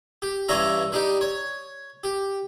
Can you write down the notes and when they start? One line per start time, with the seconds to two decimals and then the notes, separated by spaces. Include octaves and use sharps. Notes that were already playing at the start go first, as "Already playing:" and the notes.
0.22 G4
0.48 G2 E3 G3 C#4 E5 A#5
0.92 G3 D4 D#4 G4
1.21 C#5
2.04 G4